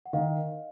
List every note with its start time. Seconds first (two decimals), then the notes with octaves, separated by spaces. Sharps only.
0.06 F#5
0.13 D#3 D#5 F5